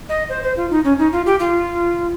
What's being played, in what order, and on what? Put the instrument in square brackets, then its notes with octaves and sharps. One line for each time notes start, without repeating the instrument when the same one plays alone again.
[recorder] D#5
C5
C5
F4
D#4
C#4
D#4
F4
G4
F4